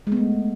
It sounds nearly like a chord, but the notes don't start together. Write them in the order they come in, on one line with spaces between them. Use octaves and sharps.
G#3 B3 A3